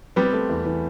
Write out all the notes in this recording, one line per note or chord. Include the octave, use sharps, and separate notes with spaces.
G3 B3 C4
A3
E2
E3